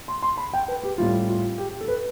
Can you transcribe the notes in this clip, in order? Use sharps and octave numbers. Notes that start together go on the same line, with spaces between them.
C6
C6
B5
G5
B4
G4
A2 G3 C4 E4 F4
F4
G4
A4
B4